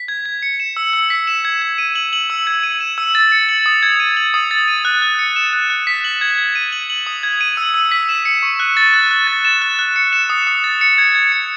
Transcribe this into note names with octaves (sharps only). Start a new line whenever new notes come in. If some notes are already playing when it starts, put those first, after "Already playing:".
Already playing: B6
G#6
G#6
C#7
E7
E6
E6
B6
E7
G#6
G#6
D#7
F#7
F#7
E6
G#6
D#7
E7
E6
A6
C#7
F#7
D#6
G#6
D#7
F#7
D#6
A6
D#7
F#6
F#6
C#7
E7
F#6
F#6
B6
F#7
G#6
G#6
D#7
F#7
F#7
D#6
G#6
D#7
E6
E6
B6
E7
C#7
C#6
F#6
A6
F#6
F#6
A6
E7
F#6
F#6
C#7
E7
D#6
D#6
A6
C#7
G#6
G#6
C#7